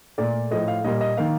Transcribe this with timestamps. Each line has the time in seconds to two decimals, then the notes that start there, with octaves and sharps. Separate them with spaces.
0.18 A#2 A3 D5
0.51 A2 F3 A3 D#5
0.68 F5
0.84 A#2 G3 A#3 D#5
1.01 D#5
1.17 D#3 A#3 F5